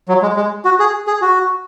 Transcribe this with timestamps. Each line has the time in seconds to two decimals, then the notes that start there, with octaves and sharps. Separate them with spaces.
0.09 F#3
0.22 G#3
0.36 G#3
0.65 F#4
0.80 G#4
1.07 G#4
1.22 F#4